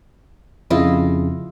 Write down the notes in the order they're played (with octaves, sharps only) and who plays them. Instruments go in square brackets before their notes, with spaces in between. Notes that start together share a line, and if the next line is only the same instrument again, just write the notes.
[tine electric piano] F2 C#3 [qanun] E4 F4 D#5